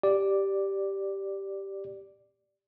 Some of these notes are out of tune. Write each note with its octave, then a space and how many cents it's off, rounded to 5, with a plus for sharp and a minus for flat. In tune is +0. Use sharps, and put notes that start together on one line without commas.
G4 -5 D5 +0